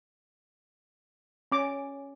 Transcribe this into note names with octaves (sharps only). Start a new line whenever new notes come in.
C#4 D6